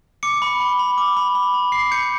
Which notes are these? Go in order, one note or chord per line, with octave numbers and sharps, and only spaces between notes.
D6 C#7
B5
B5
B5
D6
B5
B5
B5
D6 C7
G6 C#7